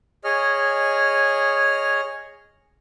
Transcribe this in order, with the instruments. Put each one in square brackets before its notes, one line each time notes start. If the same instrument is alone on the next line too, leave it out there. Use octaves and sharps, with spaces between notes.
[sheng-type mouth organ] G#4 C#5 D#5 F6